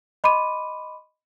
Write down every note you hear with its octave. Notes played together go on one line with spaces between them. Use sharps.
D#5 B5 C6 D6 D#7